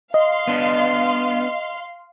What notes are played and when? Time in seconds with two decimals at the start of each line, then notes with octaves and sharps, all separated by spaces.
0.14 D#5 F5 C6
0.48 B3 D4